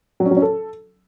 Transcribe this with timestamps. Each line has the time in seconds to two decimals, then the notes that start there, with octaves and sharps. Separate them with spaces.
0.20 F#3
0.25 C#4
0.31 F#3
0.37 C#4
0.42 A4